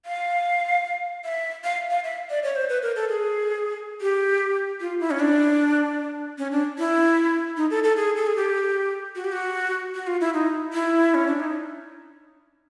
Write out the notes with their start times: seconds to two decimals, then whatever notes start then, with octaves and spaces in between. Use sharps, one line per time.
0.06 F5
1.25 E5
1.64 F5
1.90 F5
2.04 E5
2.30 D5
2.43 C#5
2.56 C5
2.69 B4
2.82 A#4
2.96 A4
3.09 G#4
4.01 G4
4.81 F4
5.00 E4
5.11 C#4
5.20 D4
6.38 C#4
6.52 D4
6.78 E4
7.57 D#4
7.70 A4
7.84 A4
7.96 G#4
8.16 A4
8.27 G#4
8.36 G4
9.16 F#4
9.24 G4
9.33 F#4
9.95 F#4
10.07 F4
10.21 E4
10.34 D#4
10.73 E4
11.14 C#4
11.27 D4
11.40 D#4